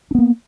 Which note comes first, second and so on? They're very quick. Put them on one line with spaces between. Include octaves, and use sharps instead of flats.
D4 B3 A#3